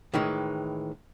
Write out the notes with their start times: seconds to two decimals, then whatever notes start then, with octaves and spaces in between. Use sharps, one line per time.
0.14 A2 D#3 E3 G#3